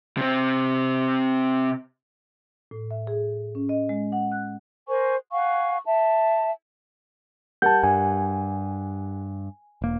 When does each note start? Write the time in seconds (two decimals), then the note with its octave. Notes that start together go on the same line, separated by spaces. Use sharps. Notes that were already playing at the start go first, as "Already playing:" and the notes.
0.17 C3 C4
2.71 A2
2.91 E5
3.07 G#4
3.55 C#4
3.69 D#5
3.89 G#3
4.12 F#5
4.32 F#6
4.88 A#4 C5 G#5 C#6
5.32 F5 F#5 G#5 C#6
5.86 E5 A5
7.62 G3 A#4 F#5 A5 G6
7.83 G2 G#5
9.82 E1 A#3